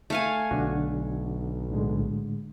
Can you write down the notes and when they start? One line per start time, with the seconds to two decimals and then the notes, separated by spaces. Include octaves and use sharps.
0.10 A3 F5 G#5
0.51 B1 D3 D4 F#4
1.70 A2 D3 G#3